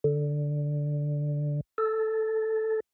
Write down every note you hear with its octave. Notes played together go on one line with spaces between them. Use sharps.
D3
A4